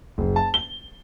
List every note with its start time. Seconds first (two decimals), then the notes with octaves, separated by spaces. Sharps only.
0.18 F#1
0.36 A5
0.54 G7